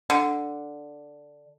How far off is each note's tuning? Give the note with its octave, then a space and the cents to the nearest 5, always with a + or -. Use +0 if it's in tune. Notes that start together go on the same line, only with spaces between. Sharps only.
D3 +0